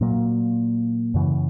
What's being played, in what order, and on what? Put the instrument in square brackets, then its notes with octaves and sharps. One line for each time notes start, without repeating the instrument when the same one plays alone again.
[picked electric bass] A#2 F#3 A#3
F#2 C#3 E3